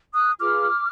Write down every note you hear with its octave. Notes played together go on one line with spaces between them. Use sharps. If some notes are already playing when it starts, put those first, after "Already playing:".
D#6 F#6
F4 G#4 B4 D6 F6